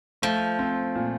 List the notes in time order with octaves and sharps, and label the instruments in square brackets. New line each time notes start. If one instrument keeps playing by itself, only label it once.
[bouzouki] F3 [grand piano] A3
[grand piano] C4
A#2